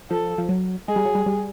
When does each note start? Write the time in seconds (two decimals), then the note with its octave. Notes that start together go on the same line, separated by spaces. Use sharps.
0.10 F3 A4
0.38 F3
0.49 F#3
0.88 G#3 G#4
0.96 G3
1.05 F#3
1.15 G3
1.26 G3